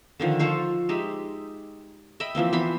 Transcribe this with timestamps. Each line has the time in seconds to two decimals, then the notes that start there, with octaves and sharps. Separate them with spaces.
0.20 D3 D#3 F3
0.39 F4 A4 C5 C#6
0.89 G#3 D#4 G4 E5
2.20 D#5 E5 G5 B5
2.35 E3 F3 A#3 C4
2.53 E3 B3 C5 B5